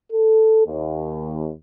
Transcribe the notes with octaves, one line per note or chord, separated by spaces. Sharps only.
A4
D#2